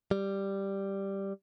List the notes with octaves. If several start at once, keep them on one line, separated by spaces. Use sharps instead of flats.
G3